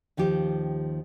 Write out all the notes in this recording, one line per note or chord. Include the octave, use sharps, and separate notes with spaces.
D#2 D#3 F3 G4